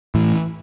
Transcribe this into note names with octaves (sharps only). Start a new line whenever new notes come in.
A2 E3